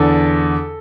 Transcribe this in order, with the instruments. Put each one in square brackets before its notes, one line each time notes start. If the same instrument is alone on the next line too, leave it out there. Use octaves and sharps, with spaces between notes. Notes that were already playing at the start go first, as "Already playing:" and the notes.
Already playing: [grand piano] E2 D3 A4